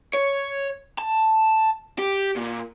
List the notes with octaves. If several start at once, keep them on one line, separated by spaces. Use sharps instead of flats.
C#5
A5
G4
A#2